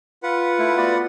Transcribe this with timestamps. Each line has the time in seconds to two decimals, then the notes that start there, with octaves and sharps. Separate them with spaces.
0.23 F4 B4 F#5
0.59 A3 E4
0.77 B3 F#4 D5